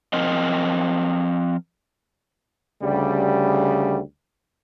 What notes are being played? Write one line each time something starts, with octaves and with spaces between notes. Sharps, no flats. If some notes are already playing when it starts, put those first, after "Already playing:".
F3 C4 A#4 D#5
D2 C#3 G3